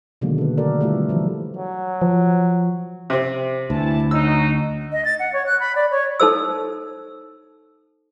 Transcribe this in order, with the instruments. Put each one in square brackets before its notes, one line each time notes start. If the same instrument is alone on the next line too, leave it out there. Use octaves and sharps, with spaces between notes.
[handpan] B2 D3 D#3 F#3 G#3 A#3
A4 B4
A3 B3 F#4 A4 A#4 D5
G3 A3 E4 F4 G4 A4
E3 F3 F#4
[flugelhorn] F#3
[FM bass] F3
[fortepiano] C3 C4
[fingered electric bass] D2 [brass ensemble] E3 E4 A5
[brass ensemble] C#4 D#4 F#4 [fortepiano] E6
[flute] D#5
A6
F#5
C#5
F#6
B5
D5
C#5
[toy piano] D#4 A4 C5 E6